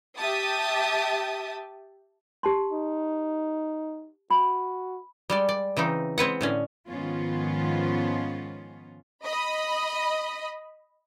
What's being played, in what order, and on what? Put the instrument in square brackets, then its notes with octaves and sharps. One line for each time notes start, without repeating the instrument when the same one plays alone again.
[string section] G4 E5 G5 A5 D#6
[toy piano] G4 A5 C6
[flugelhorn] D#4
[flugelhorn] F#4 [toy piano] B5
[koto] G3 G#3 D5
D5
C#3 E3 C4 D#4
G#3 C4 B4 F#5
A2 D3 C#4
[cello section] G#2 D#3 F3 B3 C#4 F4
[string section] D#5 B5